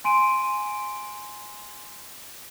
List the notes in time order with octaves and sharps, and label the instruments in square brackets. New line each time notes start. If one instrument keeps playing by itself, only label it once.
[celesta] G#5 C6 D7 D#7